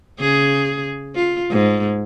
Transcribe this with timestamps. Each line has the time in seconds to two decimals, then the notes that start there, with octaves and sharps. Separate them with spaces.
0.20 C#3 G#4
1.15 F4
1.50 G#2